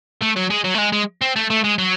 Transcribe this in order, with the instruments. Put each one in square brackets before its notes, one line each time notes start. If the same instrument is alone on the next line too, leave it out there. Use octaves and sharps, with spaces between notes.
[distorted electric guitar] A3
F#3
G#3
F#3
A3
G#3
G#3
C4
A3
A3
G#3
F#3